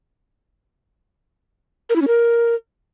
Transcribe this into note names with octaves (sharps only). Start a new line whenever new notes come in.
A#4
E4
C#4
A#4